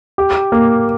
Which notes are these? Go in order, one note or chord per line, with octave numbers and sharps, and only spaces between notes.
G4
A#3